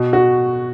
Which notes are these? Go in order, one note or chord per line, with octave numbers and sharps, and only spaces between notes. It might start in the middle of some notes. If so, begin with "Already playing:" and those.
Already playing: B2
F#4